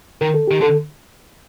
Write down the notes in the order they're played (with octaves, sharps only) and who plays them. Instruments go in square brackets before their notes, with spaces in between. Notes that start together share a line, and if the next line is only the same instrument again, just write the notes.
[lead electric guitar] D#3 [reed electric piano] A#4
[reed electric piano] A4
[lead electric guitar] D#3 [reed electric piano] G4
[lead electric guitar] D3 [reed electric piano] A4